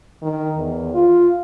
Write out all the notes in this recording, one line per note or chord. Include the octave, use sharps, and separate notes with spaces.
D#3
E2
F4